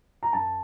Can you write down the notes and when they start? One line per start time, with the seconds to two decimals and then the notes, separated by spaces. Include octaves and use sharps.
0.23 A#5
0.33 F#2 A5